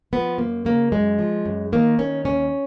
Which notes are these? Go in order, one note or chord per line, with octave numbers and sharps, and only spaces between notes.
F3 B3
F#2 A#3
C#3 A#3
F#2 G#3
F3
F#2
D#3 A#3
D#3 C#4
D#2 C#4